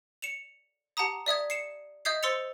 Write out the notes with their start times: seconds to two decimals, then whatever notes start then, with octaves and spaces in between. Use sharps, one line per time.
0.22 C#7 E7 F7
0.97 G4 F#5 A5 A#5 D#6
1.26 D5 E5 D#6 G#6
1.50 C7 C#7 E7
2.05 D#5 E5 D#6 G6 G#6 C7
2.23 C5 C6 E6 A6 C#7 F7